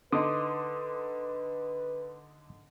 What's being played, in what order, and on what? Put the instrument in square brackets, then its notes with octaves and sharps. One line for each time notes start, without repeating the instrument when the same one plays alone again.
[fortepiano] D3 D#4 [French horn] B4 [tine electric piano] C6 D6 D#6